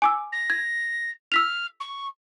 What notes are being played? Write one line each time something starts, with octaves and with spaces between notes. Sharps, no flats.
G#5 D6 E6
A#6
G#6
E6 F6 B6 F7
C#6